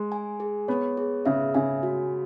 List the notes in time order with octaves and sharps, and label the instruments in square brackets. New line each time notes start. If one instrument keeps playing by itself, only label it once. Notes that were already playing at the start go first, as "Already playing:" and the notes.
Already playing: [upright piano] G#3 [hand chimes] G#4
[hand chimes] G#5
G#4
[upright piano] B3 [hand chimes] C#5
[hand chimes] G#4
[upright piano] C#3 [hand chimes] E5
[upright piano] C#3 [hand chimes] G#5
[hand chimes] F#4